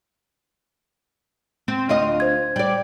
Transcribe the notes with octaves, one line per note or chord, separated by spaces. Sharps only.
C4
D2 F4 D#5
C5 G#6
G3 D5